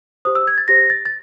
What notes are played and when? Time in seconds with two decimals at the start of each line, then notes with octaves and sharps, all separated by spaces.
0.25 G4 C5 D#6
0.35 E6
0.47 G#6
0.58 A6
0.68 G4 C5 A#6
0.90 A6
1.05 A6